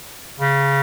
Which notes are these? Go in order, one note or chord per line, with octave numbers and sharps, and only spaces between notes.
C#3